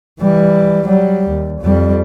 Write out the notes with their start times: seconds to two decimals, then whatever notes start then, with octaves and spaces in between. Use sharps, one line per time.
0.21 E3 G3
0.87 F#3 G3
1.28 D#2
1.62 F2 G3